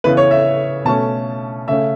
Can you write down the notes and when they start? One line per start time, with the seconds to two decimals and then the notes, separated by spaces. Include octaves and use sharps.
0.04 C#3 E3 B3 B4
0.17 C#5
0.31 E5
0.85 B2 A3 C#4 A5
1.68 C#3 A3 C#4 E5